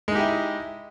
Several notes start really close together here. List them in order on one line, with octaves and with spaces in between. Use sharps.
G#3 D#4 G4 E4